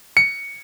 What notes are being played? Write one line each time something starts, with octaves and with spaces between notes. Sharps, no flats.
C#7